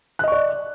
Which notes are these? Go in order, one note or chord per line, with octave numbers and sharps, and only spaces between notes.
D5 D#5 C#6 F#6